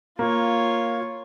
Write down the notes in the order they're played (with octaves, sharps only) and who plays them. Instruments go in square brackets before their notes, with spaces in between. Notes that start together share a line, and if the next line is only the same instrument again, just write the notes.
[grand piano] A#3 [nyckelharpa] F4 C#5